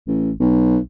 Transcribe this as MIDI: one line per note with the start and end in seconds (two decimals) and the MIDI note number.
0.07 0.32 33
0.40 0.78 35